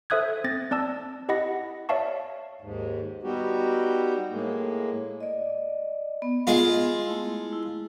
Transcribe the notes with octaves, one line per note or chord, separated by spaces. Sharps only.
A4 C5 E5 D#6 F#6 G#6
C4 A6 A#6
C4 D5 A5 E6
E4 G4 D#5 F#5 B5 A#6
C#5 D5 E5 F5 A5 C#6
D#2 G#2
G3 B3 D#4 F#4 G4
A2 G#3 A#3
D5 D#5
B3
G#3 F4
A3 E4
E4